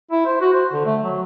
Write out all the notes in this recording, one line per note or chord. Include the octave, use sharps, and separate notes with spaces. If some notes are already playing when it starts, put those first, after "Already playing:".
E4
C5
F#4
C5
D3
A3
F#3